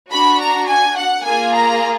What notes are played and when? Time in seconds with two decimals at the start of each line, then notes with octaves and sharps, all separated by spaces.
0.12 D4 F#4 B5
0.40 A#5
0.69 G#5
0.97 F#5
1.25 A#3 F4 G#4 G#5
1.54 A#5